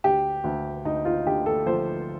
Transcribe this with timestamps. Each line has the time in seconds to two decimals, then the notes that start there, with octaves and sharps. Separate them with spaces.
0.04 D2 G4
0.44 D2
0.85 D2 D#4
1.05 F4
1.26 D3 G4
1.46 A4
1.66 F3 C5